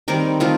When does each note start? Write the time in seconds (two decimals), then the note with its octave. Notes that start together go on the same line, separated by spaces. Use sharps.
0.08 D#3 G3 C4 A#4
0.40 D#3 A3 C4 F4